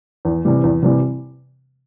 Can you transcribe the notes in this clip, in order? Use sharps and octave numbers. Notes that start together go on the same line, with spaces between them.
E2
C3 E3 G3
E2
C3 E3 G3